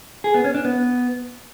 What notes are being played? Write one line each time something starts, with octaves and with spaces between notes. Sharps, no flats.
G#4
B3
C#4
D4
B3